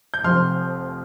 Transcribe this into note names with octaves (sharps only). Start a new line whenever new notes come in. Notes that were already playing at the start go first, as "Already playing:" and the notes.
G6
F1 F2 C3 C6 F6